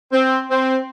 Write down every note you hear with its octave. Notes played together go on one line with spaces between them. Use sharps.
C4
C4